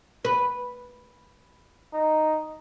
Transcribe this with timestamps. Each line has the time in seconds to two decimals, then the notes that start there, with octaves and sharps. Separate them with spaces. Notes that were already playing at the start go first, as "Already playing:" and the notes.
0.25 B4
1.93 D#4